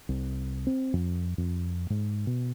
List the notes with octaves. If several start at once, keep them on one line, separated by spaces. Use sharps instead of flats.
C2
C4
F2
F2
G#2
B2